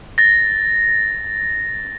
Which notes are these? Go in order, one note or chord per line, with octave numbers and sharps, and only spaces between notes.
A6 A#6